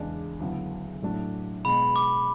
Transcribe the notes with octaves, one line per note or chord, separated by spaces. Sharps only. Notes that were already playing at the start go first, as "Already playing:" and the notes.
Already playing: E2 C#3 G#3 D4
D2 C#3 F#3 B3 E4
A2 F#3 A3 D4
B2 G#3 B3 B5
D6